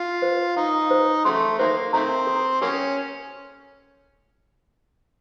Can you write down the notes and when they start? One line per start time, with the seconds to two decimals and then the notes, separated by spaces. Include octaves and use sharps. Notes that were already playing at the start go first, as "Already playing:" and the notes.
Already playing: F4
0.22 C5
0.56 D#4 F5
0.91 C5
1.25 C#3 F#3 A3 C6
1.59 D#3 F#3 A#3 C5
1.93 D#3 A3 C4 A#5
2.27 A4
2.61 F#3 A#3 C#4 A4